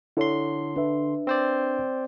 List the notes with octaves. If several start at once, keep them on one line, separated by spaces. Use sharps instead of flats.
D3 E4 A4 C#5 C6
D4 B4 E5
C4 C5 D5